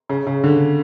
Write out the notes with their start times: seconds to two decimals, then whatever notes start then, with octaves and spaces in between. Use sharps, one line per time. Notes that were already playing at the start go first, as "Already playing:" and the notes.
0.09 C#3
0.27 C#3
0.44 D3